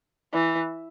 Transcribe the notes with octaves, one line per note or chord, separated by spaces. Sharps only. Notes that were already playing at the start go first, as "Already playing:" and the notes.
E3